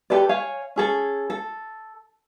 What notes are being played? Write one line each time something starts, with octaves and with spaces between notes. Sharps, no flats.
G4 A4 B4 D5
C#5 F5 G#5
C#4 G#4 A4
A4